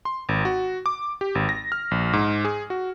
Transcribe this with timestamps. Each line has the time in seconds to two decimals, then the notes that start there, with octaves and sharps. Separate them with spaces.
0.05 C6
0.29 G#1
0.45 F#4
0.86 D6
1.21 G4
1.35 G#1
1.49 A#6
1.72 F6
1.91 A#1
2.13 G#2
2.45 G#4
2.70 F#4